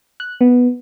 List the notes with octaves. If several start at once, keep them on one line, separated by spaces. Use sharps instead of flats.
F#6
B3